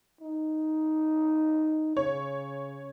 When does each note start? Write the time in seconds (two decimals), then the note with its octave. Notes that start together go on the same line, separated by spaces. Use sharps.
0.21 D#4
1.97 C#3 C#5